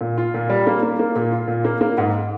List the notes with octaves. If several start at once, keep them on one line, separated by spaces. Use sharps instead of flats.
A#2
F4
A#2
G3
A#3
A#3
A#3
A#2
F4
A#2
A#3
A#3
G#2